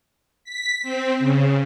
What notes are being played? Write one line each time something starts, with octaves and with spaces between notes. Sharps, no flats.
B6
C4
C#3